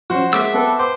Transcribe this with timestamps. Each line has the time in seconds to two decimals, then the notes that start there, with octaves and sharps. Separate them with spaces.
0.10 F3 C#4 F#4 C5
0.33 G#3 A#3 E5 D6 E6
0.54 B3 A4 B4 G5
0.79 C5 D6